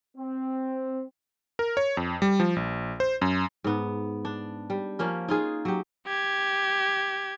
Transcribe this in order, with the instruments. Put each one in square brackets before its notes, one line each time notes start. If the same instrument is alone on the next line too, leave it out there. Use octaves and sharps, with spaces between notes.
[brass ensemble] C4
[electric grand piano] A#4
C#5
F2
G3
F3
A#1
C5
F#2
[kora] G#2 B3
D4
G3
F3 A#3 C#4
D#4 F4 G#4
F#3 G4
[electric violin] G4 G#6